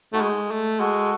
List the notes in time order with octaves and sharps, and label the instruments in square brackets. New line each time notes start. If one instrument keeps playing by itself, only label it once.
[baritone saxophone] A3 [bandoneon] D#4 F#4
[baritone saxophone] G#3
A3
[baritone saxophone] G#3 [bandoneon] F#4 A4